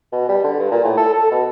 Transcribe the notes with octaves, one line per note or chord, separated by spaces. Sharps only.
B2
G3
D3
G2
A#2
A2
A4
A4
B2